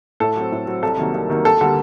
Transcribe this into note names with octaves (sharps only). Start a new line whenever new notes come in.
A2 A4
F#3 C4
A2
F#3 C4
C2 A4
C3 D#3 F#3 A#3
C2
C3 D#3 F#3 A#3
D2 A4
D3 G3 A#3 A4